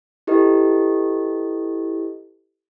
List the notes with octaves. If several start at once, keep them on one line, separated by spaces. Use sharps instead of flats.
E4 G4 A4 B4 D#5